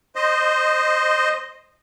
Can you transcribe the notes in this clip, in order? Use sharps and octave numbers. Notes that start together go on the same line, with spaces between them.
C5 D#5